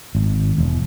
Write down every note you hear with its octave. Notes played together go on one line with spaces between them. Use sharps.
G#1
E1